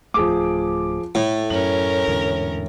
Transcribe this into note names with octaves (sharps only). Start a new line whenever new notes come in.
D1 C2 F3 A3 G#4 D6
A2 A3
F#2 C#4 A#4 F#7
E2 G#2 D3